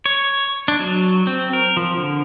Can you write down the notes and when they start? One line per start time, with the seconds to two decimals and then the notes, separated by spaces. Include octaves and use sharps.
0.06 C#5
0.68 D4
0.80 F#3
1.27 C4
1.53 A#4
1.77 F3
1.97 D3